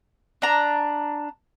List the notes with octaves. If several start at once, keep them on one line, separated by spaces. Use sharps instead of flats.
D4 A#5